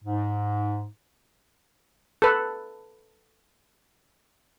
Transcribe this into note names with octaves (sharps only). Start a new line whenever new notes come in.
G#2
A4 B4